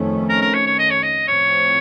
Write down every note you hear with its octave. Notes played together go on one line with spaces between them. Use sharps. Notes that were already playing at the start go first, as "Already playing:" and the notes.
Already playing: F2 D#3 A3 C#4
A#4
A#4
C#5
C#5
D#5
C#5
D#5
A2 F3 C4 C#5